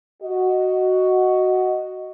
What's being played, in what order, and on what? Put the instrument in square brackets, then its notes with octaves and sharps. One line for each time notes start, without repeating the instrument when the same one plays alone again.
[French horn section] F#4 D#5